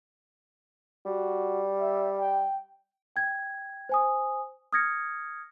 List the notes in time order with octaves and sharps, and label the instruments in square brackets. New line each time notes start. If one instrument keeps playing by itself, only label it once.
[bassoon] G3 [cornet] F#4
[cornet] E5
G5
[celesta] G5 G#6
C5 G#5 D#6
D#6 F6 G#6 A#6 C#7